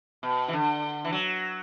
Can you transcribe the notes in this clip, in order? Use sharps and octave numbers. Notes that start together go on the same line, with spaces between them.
B2
E3
D3
E3
F#3